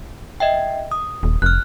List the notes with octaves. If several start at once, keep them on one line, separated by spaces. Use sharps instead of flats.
D#5 E5 G5
D#6
D#1
F1 F6 F#6